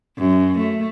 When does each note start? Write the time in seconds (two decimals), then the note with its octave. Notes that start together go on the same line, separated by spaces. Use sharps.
0.18 F#2
0.59 A3